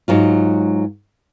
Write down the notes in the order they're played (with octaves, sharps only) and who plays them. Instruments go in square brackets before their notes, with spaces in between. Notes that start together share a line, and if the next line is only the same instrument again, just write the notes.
[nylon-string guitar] G#2 F#3 F4